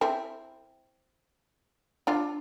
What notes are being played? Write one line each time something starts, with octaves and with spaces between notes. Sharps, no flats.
C4 E4
D4 F4